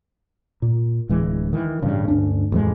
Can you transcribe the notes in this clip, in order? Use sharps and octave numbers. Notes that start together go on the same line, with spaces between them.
A#2
D1 E3 G#3
D#3 E3
A1 G2 C#3
D2 G2 C#4 D4
A1 F2 F3 G#3